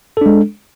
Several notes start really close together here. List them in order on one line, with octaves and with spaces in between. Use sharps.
A4 D4 G#3